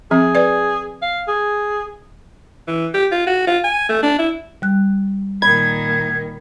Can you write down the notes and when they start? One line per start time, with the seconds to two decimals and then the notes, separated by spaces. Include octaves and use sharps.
0.11 F3 C4 G#4
0.35 B4 D5
1.02 F5
1.28 G#4
2.68 E3
2.94 G4
3.12 F4
3.27 F#4
3.47 F4
3.64 G#5
3.89 A3
4.03 D4
4.19 E4
4.62 G3 F#6
5.42 A#2 D#3 B5 G#6